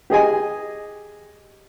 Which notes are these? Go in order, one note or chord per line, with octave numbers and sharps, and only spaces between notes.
G4 G#4 D#5 G#5